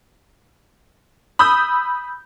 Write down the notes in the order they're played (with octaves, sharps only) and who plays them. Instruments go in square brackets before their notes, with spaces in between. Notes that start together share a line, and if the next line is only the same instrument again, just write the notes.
[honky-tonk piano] B5 D#6 E6 G6